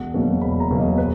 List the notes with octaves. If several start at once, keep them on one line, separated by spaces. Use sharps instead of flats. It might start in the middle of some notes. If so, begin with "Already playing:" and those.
Already playing: E1 F#5
E2 B2 F#3 A#3
E1 B5
A#5
E2 B2 F#3 A#3
D#5
B4